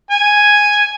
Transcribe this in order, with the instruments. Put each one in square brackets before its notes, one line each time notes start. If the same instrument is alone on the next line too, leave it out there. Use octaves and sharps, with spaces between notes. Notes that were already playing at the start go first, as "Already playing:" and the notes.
[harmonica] G#5